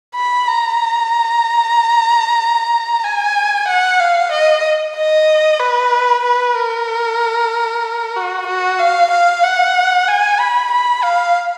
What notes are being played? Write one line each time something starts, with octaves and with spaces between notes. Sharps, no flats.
B5
A#5
G#5
F#5
F5
D#5
D#5
B4
B4
A#4
F#4
F#4
F5
F5
F#5
G#5
B5
B5
F5